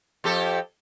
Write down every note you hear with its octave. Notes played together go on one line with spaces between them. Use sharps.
F2 G4 A4